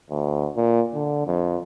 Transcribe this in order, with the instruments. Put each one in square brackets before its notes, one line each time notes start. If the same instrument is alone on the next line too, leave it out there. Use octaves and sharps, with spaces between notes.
[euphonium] D2
A#2
D3
F2